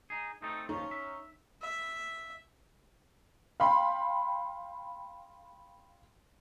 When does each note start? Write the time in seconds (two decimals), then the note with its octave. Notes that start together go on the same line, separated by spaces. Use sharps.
0.10 D#4 G#4
0.42 A3 C4 D#4 A4
0.69 D#2 F3 C#4 D#4
0.91 E5
1.62 E5
3.60 F5 G5 B5 C6